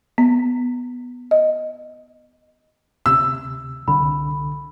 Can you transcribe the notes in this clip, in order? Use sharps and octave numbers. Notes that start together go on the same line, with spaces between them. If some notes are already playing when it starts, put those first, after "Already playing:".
B3
D#5
D2 C3 E6
C2 D3 B5